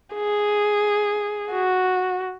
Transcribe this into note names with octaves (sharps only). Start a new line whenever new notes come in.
G#4
F#4